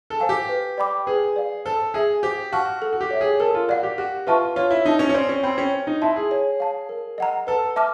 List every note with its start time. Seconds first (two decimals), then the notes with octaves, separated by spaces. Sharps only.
0.10 A4
0.20 C5 F5 G#5
0.29 G4
0.49 B4
0.78 D5 G5 B5 D6
1.07 G#4 B4
1.36 D5 F5
1.66 A4 C5
1.94 G#4 E5 G#5
2.23 G4 C5
2.52 F#4 F5 A5 C#6 F6
2.82 A4
2.93 F#4
3.01 G4
3.11 C#5 E5
3.21 G#4
3.40 A4 A#4
3.54 F4
3.68 F#4 D5 F5
3.83 G4
3.98 F#4 G4
4.27 F4 B4 E5 A5 C#6
4.56 F4 C#5
4.71 E4
4.85 D#4 E5 A5
4.99 C#4
5.09 C#4
5.14 C4 D5
5.29 C#4
5.43 C4 G5 B5 E6
5.58 C#4
5.73 C5
5.87 D#4
6.02 E4 E5 A5 C6
6.16 G#4
6.31 C#5
6.60 F5 A5
6.89 A#4
7.18 D#5 F#5 A#5
7.47 A4 B4
7.76 E5 A5 D6 F6